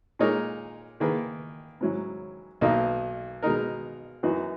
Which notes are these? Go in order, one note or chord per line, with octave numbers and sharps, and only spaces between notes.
A#2 G#3 D#4 A#4 C#5
D#3 A#3 E4 G#4 B4
G#2 F#3 C#4 E4
B1 B2 A#3 D#4
B2 G#3 D#4 A#4
F#2 E3 B3 D#4 F#4